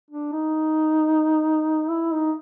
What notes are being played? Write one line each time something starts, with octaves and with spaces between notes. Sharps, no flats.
D4
D#4
E4
D#4